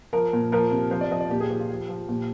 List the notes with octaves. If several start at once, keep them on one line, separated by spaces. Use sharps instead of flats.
F3 A#4
A#2
F3 A#4
C3
F3 C5
D5
F3 D#5
D5
A#2 G4
G#4
F3 G4
F4
F3 G4
F3
A#2 G4